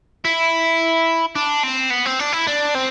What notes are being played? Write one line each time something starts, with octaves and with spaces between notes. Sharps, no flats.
E4
D4
C4
B3
C4
D4
E4
D4
C4